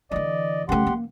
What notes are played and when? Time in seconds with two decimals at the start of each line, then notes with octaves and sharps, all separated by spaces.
0.11 D3 E3 D5 D#5
0.69 C#3 A3 G4 F#5 C6
0.86 A#3